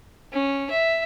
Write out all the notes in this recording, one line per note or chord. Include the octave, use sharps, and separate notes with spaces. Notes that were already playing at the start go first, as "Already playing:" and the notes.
C#4
E5